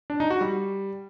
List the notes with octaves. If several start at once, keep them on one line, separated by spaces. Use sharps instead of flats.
D4
D#4
F#4
G3